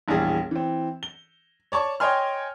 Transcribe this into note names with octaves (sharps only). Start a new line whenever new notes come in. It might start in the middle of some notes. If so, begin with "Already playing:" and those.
E1 A#1 E3 G3 G#4
E3 C4
G7
C#5 D5 A5 C#6
C#5 D#5 G5 G#5 C6 F6